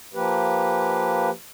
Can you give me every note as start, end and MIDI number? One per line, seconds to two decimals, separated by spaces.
0.14 1.30 53
0.14 1.30 58
0.14 1.30 67
0.14 1.30 71